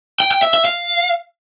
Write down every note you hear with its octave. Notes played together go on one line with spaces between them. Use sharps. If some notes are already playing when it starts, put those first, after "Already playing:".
G5
G5
E5
E5
F5